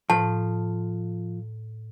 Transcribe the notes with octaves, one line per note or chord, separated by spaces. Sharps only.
A2 F3 A5